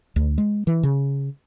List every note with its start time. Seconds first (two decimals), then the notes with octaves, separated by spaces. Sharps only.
0.16 D2
0.38 G#3
0.67 E3
0.83 C#3